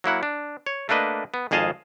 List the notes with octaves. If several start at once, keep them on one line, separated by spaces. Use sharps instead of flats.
F#3 A#3 E4 F#5
D4
C#5
A3 A#3 D4 B4 D#5
B3
G#1 F2 G#4 D#5 F5 A5